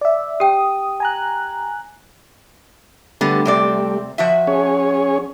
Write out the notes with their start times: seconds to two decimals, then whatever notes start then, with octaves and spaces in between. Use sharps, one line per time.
0.01 D5 E5
0.40 G4 G5 D#6
1.00 G#5 A#5 F#6
3.21 D3 G3 A3 B3
3.45 C3 C4 D5
4.18 F3 F#4 E5
4.47 C#4 G#4 C#5